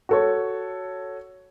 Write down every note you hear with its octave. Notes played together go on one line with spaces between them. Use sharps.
F#4 A4 C#5